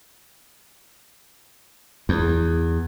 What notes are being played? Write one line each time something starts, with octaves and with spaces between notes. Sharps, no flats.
E2